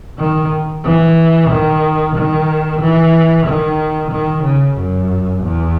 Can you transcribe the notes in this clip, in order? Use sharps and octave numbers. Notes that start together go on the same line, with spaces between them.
D#3
E3
D#3
D#3
E3
D#3
D#3
C#3
F#2
E2